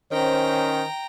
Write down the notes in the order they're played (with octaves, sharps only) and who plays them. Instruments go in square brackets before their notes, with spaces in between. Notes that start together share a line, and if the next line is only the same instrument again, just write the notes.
[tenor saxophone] D#3 [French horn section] C#4 C5 [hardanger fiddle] G5 A#5